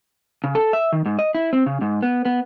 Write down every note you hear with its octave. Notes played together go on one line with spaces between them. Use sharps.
C#3
A4
E5
D#3
G#2
D#5
E4
C4
C#3
G#2
B3
B3